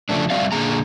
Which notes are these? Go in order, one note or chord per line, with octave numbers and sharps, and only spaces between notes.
C#3 F3 A3 D4
G3 C4 F#4 D5 E5 F5
A#2 D3 A#3 G#4 A#5